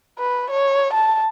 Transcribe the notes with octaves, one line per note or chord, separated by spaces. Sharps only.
B4
C#5
A5